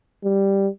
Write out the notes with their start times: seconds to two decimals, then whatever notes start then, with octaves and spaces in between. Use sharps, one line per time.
0.24 G3